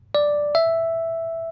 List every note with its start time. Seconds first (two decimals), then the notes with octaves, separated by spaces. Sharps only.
0.15 D5
0.55 E5